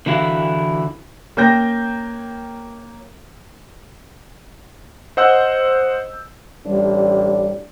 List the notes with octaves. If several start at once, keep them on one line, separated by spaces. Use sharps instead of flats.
D3 E3 E4 F#4 F5
A#3 C#4 G5 G6 A#6
C5 D#5 F#5 E6 G6
A1 G3 D4